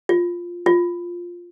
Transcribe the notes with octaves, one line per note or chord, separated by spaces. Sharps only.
F4
F4